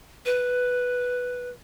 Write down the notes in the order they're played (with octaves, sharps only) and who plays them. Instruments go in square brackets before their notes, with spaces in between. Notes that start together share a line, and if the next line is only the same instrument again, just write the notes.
[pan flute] B4